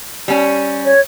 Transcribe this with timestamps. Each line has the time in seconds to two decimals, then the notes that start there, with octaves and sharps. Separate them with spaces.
0.28 G3 C#4
0.85 C#5